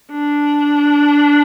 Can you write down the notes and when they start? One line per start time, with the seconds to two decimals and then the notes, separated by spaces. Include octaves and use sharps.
0.12 D4